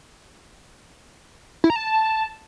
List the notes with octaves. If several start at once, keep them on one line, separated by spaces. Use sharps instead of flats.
E4
A#5
A5